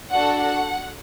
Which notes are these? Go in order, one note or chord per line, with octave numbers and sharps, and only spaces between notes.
D4 F#4 A4 F#5
F#5